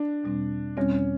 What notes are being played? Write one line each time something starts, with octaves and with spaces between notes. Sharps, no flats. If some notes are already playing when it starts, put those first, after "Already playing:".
Already playing: D4
E2 B2 G3 C4
E2 B2 G3 C4 C#4